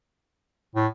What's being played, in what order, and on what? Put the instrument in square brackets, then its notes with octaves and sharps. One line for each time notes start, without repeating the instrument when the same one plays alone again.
[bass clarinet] A2